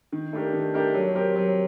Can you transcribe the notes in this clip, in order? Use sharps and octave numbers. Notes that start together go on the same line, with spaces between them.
D#3
A3 D4 G4 A#4
D#3
A3 D4 G4 A#4
F#3
C4 G4 A#4
F#3